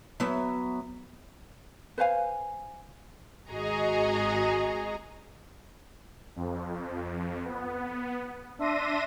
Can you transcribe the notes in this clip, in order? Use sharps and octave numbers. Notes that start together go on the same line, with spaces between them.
F#3 B3 E5
B4 C5 F5 G#5
G#1 F#4 G#4 D#5 A#5 C#6
F2
B3
D4 E5 C6 A#6 D#7